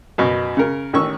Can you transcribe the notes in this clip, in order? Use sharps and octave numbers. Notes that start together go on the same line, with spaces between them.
F#2 B2
C#3 A#4
A1 D#3 C#4 C#6 E6